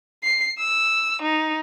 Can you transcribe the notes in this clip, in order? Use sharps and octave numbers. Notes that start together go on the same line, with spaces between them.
C7
E6
D#4